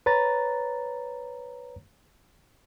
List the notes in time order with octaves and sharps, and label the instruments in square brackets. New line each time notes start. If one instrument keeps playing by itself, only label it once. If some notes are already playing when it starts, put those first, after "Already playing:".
[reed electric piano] B4 C#5 A#5 A6